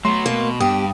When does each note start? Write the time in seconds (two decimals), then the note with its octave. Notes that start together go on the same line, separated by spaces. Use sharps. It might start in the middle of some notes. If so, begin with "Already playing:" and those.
0.05 F#3 A3 B3 C6
0.26 B2 A#3
0.60 G2 B3 G4 D#6